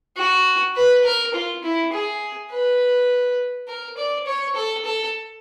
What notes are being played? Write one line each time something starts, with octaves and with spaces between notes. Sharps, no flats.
F#4
B4
A#4
F4
E4
G#4
B4
A#4
D5
C#5
A4
A4